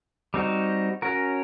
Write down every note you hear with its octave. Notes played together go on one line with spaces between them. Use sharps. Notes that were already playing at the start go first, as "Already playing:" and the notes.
G3 C4 D#4 F#4
C#4 F#4 A#4